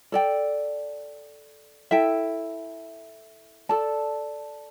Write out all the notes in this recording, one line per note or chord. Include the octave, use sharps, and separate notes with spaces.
A4 D5 G5
E4 A4 E5 G5
A4 D5 A5